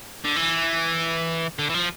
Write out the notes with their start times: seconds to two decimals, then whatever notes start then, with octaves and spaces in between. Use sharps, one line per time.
0.25 D3
0.36 E3
1.59 D3
1.69 E3
1.74 F3